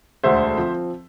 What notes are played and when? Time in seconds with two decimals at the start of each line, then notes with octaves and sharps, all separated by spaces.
0.24 E1 D2 D3 A3 C5 E5
0.56 F3 C4